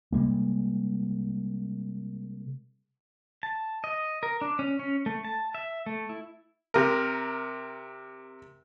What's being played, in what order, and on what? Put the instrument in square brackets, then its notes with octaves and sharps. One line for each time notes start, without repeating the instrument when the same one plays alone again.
[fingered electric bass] C3 G3 G#3 A#3
[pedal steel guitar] A5
D#5
A#4
D4
C#4
C#4
A3
A5
E5
A3
E4
[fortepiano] C3 A#4